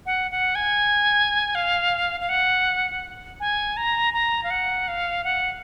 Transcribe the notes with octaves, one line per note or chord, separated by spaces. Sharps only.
F#5
F#5
G#5
F5
F5
F#5
G#5
A#5
A#5
F5
F#5
F5
F#5